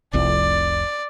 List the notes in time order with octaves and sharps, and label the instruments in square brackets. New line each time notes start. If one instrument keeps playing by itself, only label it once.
[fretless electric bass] F1 C2 F2 [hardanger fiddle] D5